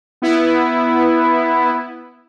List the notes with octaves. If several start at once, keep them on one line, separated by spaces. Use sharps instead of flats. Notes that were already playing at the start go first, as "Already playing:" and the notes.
B3 E4